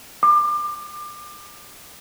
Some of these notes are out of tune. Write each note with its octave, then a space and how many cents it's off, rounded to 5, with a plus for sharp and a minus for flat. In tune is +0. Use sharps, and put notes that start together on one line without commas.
D6 +30